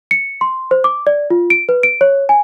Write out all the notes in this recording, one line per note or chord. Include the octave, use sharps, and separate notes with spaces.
C#7
C6
C5
D6
D5
F4
D7
B4
D7
C#5
G#5